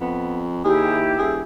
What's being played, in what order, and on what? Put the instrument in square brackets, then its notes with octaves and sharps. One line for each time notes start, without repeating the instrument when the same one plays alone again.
[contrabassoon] F2 [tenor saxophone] B3
[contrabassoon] D#2 [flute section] E4 G4 [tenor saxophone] G#4
[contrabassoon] E1 [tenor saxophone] G#4